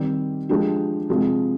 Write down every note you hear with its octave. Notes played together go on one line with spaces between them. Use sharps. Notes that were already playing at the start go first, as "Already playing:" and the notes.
Already playing: D#3 G3 C4 G4
F3 G#3 D4 G4
C3 F3 G#3